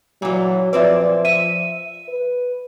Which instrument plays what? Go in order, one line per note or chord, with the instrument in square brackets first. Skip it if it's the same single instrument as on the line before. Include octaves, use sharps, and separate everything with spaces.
[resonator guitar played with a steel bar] A#2 E3 [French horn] F#3
[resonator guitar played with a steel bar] A#2 C4 D5 [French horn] F3 [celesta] B4 E5
[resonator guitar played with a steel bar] E5 [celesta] D#7
[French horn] B4